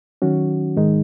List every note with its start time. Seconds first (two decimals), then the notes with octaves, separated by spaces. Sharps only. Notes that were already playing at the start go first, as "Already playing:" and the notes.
0.22 D#3 F#3 C#4 F#4
0.76 G#2 D#3 G#3 D#4